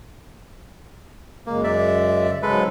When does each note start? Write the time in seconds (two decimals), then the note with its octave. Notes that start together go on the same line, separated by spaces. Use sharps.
1.47 F#2 C#3 G#3 A#3
1.64 D5 E5
2.43 G#2 C#3 F#3 G#3 A4 B4